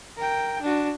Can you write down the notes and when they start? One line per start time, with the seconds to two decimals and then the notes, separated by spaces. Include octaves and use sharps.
0.17 A#4 G5
0.62 D4 F#4